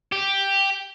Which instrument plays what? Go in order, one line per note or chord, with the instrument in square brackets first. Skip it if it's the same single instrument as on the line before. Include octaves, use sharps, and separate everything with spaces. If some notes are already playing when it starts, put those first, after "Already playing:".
[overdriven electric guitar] G4